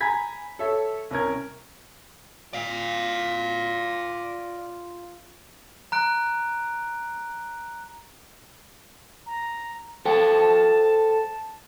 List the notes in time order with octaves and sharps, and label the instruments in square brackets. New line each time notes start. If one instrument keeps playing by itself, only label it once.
[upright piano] G#5 A#5 B5 G#6 B6
A4 C#5 E5
C2 C#4 A#4 G#6
[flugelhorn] F4 [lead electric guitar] D5 F5
[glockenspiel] A#5 F#6 D7
[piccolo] A#5
[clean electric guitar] A4 C5 G5 [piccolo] A5